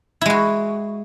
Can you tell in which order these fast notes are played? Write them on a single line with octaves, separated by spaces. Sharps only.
E4 G#3 F#4